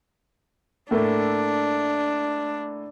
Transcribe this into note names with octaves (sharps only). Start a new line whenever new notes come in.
A2 A3 A#3 D4